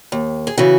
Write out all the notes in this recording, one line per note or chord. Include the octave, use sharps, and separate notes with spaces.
D#2
G#4
C#3 E3 F#4